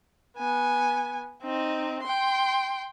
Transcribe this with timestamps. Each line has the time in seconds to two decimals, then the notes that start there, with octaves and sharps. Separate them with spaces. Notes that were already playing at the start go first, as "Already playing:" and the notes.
0.37 B3 G#5
1.43 C4 D#4
2.03 G5 C6